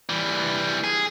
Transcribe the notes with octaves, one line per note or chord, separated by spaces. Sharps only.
E3 G3
G#4